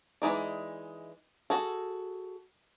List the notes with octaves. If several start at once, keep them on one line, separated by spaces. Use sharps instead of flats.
E3 G#3 D#4 D5
F#4 G#4 A4